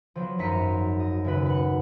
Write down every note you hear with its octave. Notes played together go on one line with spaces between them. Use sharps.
F3 F#3 B3
G#1 F#2 A#5 B6 C#7 D#7
D#5
D#1 C#3 B4
B4 F#5